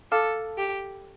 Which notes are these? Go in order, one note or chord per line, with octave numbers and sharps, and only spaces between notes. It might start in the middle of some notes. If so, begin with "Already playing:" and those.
A4 F5 A5 D6 F6
G4